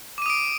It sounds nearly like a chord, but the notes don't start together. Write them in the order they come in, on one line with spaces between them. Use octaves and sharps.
D6 D#7 D#6 D7